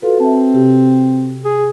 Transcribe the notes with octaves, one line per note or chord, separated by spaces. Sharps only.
F4 F#4 A4 B4
C4 E5 A5
C3 G4
G#4